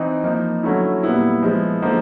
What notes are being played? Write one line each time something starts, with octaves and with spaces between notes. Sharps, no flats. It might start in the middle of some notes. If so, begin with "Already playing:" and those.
Already playing: E3 C4 D#4
F3 A#3 D#4
D3 F#3 A3 C#4 E4
A#2 G3 B3 E4
F3 G#3 B3 E4
D3 F3 A#3 D#4